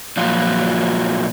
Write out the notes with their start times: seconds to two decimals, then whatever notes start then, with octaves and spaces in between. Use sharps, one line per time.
0.17 A#2 F3 F#3 F4 F#4